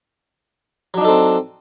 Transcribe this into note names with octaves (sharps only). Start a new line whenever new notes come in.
F#3 C4 D4 D#4 A4